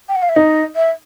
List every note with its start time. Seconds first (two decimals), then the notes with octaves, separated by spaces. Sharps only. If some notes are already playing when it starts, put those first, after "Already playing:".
0.08 G5
0.15 F#5
0.22 F5
0.29 E5
0.36 D#4 D#5
0.76 E5